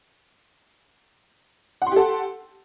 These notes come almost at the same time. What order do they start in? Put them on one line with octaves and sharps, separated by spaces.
F#5 C6 G4 A4